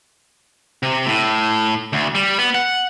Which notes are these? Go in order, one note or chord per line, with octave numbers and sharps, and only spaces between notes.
C3
A2
D2
G3
B3
F#5